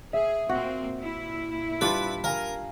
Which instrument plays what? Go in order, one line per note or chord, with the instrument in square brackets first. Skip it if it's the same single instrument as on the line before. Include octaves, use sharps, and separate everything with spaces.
[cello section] G#4 [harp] E5
[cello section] A#2 A#3 C4 [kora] F#4
[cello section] A#2 E4
[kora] G3 D4 F4 [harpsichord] B4
[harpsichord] A#4 [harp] F5 G#5 A#5